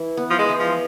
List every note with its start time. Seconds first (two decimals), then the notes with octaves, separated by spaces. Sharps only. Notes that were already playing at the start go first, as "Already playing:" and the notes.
Already playing: E3 E4
0.17 B3
0.30 F3
0.38 G#3
0.49 E3
0.59 F3